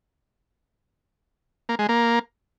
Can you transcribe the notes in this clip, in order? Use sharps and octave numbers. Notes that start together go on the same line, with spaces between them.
A#3
G#3
A#3